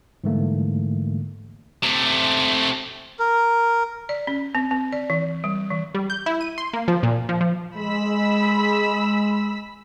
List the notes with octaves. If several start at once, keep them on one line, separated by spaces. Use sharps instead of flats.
G#2 D3 E3 G3 A3 A#3
C3 A3
A#4
D5
C#4
C4
C4
D5
E3
G3
E3
G3
G6
E4
D#7
C6
A#3
F3
A#2
F3
F3
G#3 B5 E6 B6